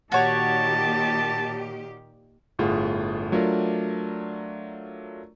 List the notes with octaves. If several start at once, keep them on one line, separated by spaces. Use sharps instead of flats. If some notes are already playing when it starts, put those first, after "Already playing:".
A#2 D#3 F#4 G4 C#5 A5
G1 A2 F4 G#4 F#5
F#3 A3 D4 F4 A#4 D5